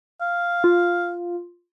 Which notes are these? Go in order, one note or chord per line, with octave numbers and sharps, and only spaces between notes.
F5
F4